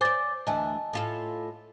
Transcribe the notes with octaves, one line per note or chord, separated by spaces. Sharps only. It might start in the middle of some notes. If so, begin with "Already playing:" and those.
C5 D5 G#5 D6 A6
D2 E3 D#5 G#5 A5
A2 F4 A4